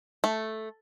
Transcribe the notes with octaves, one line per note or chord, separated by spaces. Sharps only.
A3